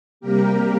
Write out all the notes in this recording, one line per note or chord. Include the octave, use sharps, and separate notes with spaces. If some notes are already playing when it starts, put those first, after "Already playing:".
C3 G3 A#3 G4 A#4